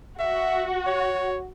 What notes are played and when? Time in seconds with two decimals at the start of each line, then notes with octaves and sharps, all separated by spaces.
0.19 F#4 E5
0.87 C#5